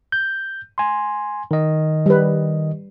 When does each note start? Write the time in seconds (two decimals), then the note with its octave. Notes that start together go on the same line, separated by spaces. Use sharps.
0.12 G6
0.78 G#5 C6
1.51 D#3 D#5
2.06 G3 B4